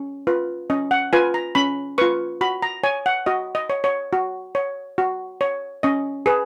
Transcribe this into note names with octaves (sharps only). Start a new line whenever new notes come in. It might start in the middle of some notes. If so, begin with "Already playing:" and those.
Already playing: C#4
F4 B4
C#4 D#5
F#5
F4 B4 G#5
A#5
C#4 B5
F4 B4 C#6
F#4 B5
A#5
C#5 G#5
F#5
F#4 D#5
D#5
C#5
C#5
F#4
C#5
F#4
C#5
C#4 D#5
G#4 B4